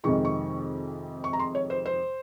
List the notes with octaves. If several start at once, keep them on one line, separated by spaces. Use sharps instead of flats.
F2 C3 D#3 G#3 C#6
C#6
C#6
A#5
C6
C#5
C5
C5